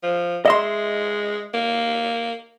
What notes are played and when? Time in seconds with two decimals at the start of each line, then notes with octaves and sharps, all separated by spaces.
0.03 F3
0.45 G#3 D#5 E5 C6
1.54 A#3